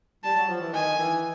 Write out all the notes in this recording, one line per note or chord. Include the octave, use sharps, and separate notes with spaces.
G3 A5
F#3
F3
E3
D#3 G#5
E3